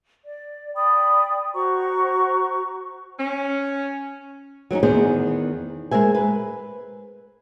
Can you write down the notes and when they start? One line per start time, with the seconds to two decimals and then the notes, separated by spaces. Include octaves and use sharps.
0.25 D5
0.75 D5 G5 B5 D#6
1.54 F#4 C5 A#5 C#6
3.18 C#4
4.71 F#3 B3 C#4 D#4
4.83 E2 D#3 B3 G#4 C5
5.91 G#3 A#4 C5 E5 G#5
6.15 B4